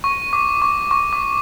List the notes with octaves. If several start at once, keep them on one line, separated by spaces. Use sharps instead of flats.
C#6
D6
C#6
C#6
D6